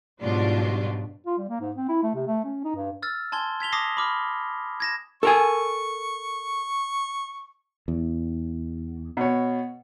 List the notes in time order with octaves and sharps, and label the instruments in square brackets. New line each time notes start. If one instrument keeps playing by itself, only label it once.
[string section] G#2 B2 F#3 G3 D4 F4
[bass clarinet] F4
G3
A#3
G#2
C4
E4
A3
C3
A3
C#4
D#4
G2
[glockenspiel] E6 F6 A6
G#5 A5 C6 G#6 G7
G#6 B6 F7 G7
A5 D6 D#6 A#6 C7
B5 D6 F6
G#6 A#6 E7
[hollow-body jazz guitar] A4 A#4 G#5 [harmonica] C#6
[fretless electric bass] E2
[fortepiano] B2 C#5